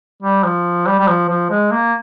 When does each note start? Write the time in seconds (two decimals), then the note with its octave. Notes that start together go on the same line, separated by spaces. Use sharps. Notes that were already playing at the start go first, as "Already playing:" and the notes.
0.23 G3
0.44 F3
0.87 G3
0.99 G3
1.08 F3
1.29 F3
1.50 G#3
1.72 A#3